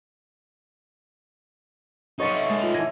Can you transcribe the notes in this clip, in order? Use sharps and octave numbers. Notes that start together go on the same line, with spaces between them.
D#4 A4 C#5 C6 C#6 D#6 A6 C#7
E5
G#3 A6
F4 F7
E3 G#5 A#6